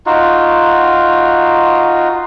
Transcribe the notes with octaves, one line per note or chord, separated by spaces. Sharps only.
D#4 F4 F#4